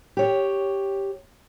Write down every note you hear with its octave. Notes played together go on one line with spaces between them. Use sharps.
G4 C#5